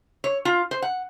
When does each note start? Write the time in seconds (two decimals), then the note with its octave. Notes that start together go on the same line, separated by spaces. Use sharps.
0.24 C#5
0.45 F4
0.71 C5
0.82 F#5